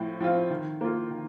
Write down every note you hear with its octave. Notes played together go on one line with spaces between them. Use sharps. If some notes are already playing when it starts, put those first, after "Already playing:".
Already playing: A2 F3 C4
F3 C4 F4
D#3
A#3 F4
D#3